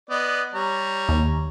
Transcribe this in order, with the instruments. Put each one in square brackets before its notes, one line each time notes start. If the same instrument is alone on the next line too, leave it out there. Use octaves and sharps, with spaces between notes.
[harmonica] B3 D5 D#5
G3 C#5 A#5
[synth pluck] D#2